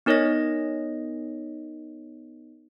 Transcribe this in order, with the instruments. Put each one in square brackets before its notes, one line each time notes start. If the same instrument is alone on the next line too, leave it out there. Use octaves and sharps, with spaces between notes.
[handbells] B3 D#4 A#4 C#5 D#5 A#6